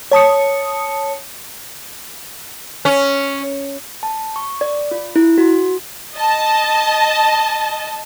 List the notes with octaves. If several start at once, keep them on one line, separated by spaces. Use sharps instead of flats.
C#5 A5 D#6 C#7
C#4
A5
C#6
D5
F4
E4
F#4
D#5 A5